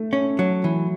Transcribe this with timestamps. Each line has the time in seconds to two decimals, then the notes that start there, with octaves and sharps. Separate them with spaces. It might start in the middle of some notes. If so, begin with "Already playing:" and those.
Already playing: A3
0.13 C#4
0.39 F#3
0.64 E3